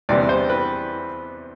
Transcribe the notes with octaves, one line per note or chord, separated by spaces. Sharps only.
E2 C3 G3 B3 D4 D5
C5
B4